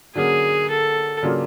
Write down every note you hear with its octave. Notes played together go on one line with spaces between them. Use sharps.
D3 F#3 A#3 C#4 G#4
A4
C#3 F#3 A#3 D4 F4